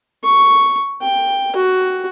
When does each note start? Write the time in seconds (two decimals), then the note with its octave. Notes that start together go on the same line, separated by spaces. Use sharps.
0.24 C#6
1.02 G5
1.55 F#4